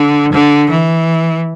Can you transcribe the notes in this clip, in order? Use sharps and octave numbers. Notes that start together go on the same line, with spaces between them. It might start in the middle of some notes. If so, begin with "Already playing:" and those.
Already playing: D3
D3
E3